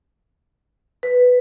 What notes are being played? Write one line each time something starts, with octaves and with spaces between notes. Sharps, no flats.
B4